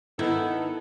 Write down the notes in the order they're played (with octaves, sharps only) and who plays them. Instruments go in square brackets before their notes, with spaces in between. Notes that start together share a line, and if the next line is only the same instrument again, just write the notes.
[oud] D#3 [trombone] B3 [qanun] E4 [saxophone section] A4